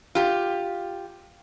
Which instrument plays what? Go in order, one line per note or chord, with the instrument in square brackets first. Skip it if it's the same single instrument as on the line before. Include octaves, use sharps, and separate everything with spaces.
[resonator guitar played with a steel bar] F4 G4